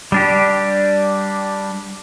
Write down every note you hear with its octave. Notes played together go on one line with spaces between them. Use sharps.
G3 D4 G4